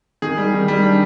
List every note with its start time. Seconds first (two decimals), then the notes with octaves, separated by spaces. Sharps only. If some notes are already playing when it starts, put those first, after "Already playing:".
0.22 D#3 G#4
0.37 G3
0.53 D#3
0.68 G3
0.83 D4